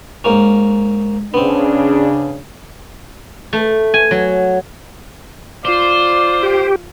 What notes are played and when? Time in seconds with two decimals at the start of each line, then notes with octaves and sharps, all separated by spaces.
0.24 G#2 A#3 C#4
1.34 C#3 B3 C4 D4
3.53 A3
3.94 G#5
4.11 F#3
5.65 F4 C5 D5
6.43 G4